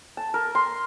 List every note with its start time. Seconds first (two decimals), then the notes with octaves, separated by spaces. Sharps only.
0.17 A5
0.34 A#4
0.55 C6